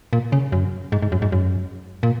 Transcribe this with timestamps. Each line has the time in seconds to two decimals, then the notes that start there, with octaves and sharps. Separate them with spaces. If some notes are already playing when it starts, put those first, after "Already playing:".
0.13 A#2
0.32 C#3
0.52 F#2
0.92 G#2
1.02 G#2
1.12 F#2
1.22 G#2
1.32 F#2
2.03 A#2